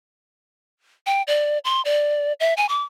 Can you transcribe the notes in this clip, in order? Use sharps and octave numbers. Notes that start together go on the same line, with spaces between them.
G5
D5
C6
D5
E5
G#5
D6